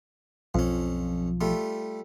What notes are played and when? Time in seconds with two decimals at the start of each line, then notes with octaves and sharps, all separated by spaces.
0.54 B1 F2 F3 C#4
1.41 G3 A3 F4